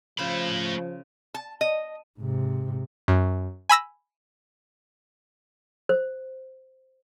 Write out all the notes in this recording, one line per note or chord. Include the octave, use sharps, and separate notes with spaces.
C#3 F3 A3 C5 B5
A5
D#5
G#2 C3
F#2
G#5 B5 E6 A#6
C5